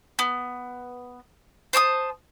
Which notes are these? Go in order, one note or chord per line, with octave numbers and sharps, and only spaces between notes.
B3
C5 A5 D6 D#6